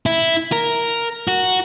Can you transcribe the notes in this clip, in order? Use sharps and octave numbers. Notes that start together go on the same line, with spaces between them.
E4
A#4
F#4